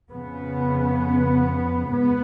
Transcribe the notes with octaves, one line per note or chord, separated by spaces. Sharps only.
F2 C#3 B3
G#2 B3